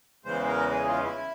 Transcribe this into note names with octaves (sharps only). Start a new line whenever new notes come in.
E2 C#3 E3 G#3 C5
A#4
G#4
F4
C#4
E4